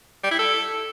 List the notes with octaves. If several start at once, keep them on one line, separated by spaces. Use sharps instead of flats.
G3
E4
A4